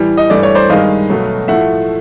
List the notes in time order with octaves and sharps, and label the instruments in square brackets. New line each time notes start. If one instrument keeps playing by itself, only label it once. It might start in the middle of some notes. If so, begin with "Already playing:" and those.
Already playing: [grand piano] A2 E3 G3
D#5
G2 E3 A3 D5
C#5
C5 D5
G2 D#3 G#3 D#5 F5
B2 F#3 A3
A2 F3 A3 E5 F#5